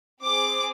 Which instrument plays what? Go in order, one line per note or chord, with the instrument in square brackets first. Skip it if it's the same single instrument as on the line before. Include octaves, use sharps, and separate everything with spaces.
[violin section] C4 G#4 D6